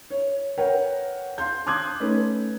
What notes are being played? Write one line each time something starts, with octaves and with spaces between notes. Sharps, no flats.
C#5
A#4 B4 C#5 F#5 G5
F5 C6 G6
A5 C6 D6 D#6 F#6 G#6
A3 C#4 D#4 B4